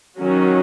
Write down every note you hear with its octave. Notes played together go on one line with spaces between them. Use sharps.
D#3 F#3 C#4 F#4